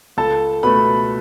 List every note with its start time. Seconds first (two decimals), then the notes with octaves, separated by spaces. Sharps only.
0.17 C#2 A4 A5
0.63 B2 A3 B4 B5